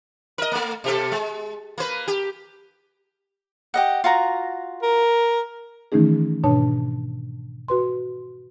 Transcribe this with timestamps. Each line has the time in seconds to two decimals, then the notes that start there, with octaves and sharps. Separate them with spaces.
0.38 A#4 D#5
0.52 A3 A#3
0.84 B2 G4 A4
1.12 G#3
1.78 A#3 B4
2.08 G4
3.74 G4 D#5 F#5
4.04 F4 F#4 A#5
4.83 A#4
5.92 D#3 E3 A3 C#4 D#4 G#4
6.44 G#2 B2 D4 C#5 A5
7.68 F#4 B4 C6